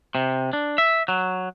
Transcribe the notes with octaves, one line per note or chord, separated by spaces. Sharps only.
C3
D4
E5
F#3